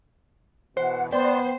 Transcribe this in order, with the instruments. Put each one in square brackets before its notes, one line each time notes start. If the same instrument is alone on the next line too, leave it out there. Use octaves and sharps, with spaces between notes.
[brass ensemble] B2 E3 [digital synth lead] C5 [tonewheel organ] F#5
[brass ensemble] B3 [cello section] C5 [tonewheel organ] D5 C6 [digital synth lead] G5